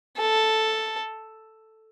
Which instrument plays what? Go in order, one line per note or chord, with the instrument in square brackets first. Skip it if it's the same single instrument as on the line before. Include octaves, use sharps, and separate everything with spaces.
[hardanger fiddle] A4